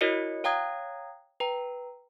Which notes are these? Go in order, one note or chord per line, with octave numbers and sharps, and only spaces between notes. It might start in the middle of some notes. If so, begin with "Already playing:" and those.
E4 F#4 A#4 C#5 D#5 C#7
C#5 F5 G5 A#5 D#6 G#6
B4 G5 A#5